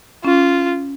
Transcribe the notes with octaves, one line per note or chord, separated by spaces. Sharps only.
C#4 F4